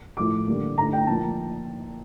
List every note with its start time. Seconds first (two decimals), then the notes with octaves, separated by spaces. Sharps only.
0.17 A2 F3 A3 D6
0.47 D3 G3 A#3
0.78 D3 A3 A#5
0.93 G5
1.07 A#2 F3 A#3 A5